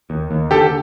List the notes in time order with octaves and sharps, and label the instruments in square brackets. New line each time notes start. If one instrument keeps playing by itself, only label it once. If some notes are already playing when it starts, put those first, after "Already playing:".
[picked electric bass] D#2
D#2
[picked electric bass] D3 [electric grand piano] G4 A4